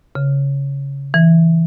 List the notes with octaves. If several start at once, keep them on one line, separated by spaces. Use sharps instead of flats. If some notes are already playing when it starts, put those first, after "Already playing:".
C#3
E3